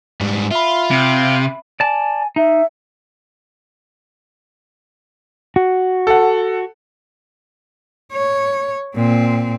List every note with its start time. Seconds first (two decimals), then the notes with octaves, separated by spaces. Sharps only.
0.21 G#2 G3
0.51 F4 E5 B5
0.91 C3
1.80 D5 G#5 A5
2.36 D#4 E5
5.56 F#4
6.07 A4 F#5
8.13 C#5
8.96 A#2 C4